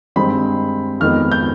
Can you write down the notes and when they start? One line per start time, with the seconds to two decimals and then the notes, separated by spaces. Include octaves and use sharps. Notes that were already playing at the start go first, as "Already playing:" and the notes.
0.16 G2 D#3 G#3 C4 D#4 B5
1.00 F2 D#3 G#3 B3 F6
1.32 G6